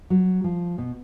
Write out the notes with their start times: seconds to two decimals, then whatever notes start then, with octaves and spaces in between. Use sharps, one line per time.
0.10 F#3
0.44 F3
0.78 B2